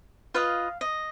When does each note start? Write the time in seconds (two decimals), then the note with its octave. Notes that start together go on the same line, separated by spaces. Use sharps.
0.34 F4 B4 D#5 F5
0.81 D#5